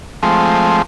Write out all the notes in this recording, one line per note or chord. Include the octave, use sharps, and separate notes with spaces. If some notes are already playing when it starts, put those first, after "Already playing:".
F3 G#3 A3 C4